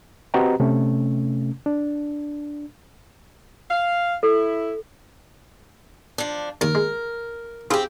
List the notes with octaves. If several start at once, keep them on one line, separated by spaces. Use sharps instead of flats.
C4 F#4 G4 B4 D#5 A#5
C3 A3 C#4
D4
F5
E4 A4
F3 D4
D#2 A#4
G#3
C4 E4 F4 G4 G#4